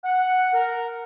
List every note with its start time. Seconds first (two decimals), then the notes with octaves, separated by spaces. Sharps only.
0.04 F#5
0.54 A#4